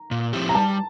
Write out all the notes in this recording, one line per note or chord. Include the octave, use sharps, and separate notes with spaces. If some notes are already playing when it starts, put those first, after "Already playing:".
Already playing: A#5
A#2
F3 C4 E4 G4
A#5
G3 A5